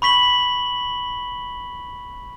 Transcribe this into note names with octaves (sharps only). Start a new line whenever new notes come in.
B5 C#6 B6 F#7 G7